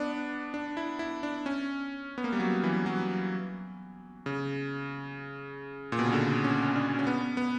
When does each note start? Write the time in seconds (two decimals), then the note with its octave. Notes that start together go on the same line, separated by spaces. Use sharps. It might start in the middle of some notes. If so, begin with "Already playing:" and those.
Already playing: B3 D4
0.54 D4
0.77 E4
0.99 E4
1.23 D4
1.46 C#4
2.18 B3
2.24 A#3
2.32 G3
2.40 F#3
2.64 E3
2.86 F#3
4.26 C#3
5.92 A#2
5.99 B2
6.06 C#3
6.13 D3
6.44 C#4
6.65 C#4
6.76 D4
6.99 C#4
7.07 B3
7.37 B3